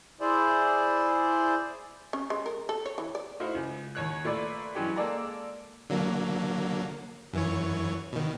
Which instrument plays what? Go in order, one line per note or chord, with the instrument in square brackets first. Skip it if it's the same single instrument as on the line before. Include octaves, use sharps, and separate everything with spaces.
[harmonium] E4 G#4 C5 D5
[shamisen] C#4
G#3
A#4
A4
C#5
E3
D5
[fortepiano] A3 D#4 E4 F#4 C5 F5
C#2
D#2 C#5 F#6
A#2 A3 B4 D5
G2 E3 F#3 G#3 C#4 G4
G#3 A#3 A4 D5 A#5
[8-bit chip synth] D3 F#3 A#3
F#2 E3 C#5
B2 D#3